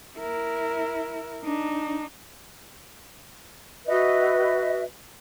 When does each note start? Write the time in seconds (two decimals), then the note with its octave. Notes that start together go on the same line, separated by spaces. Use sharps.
0.18 E4 A#4
1.44 D4 D#4
3.86 F#4 B4 D#5 E5